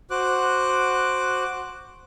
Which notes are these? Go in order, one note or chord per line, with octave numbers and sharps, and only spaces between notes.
F#4 C5 D6 F#6